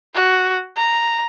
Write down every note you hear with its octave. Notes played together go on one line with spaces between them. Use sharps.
F#4
A#5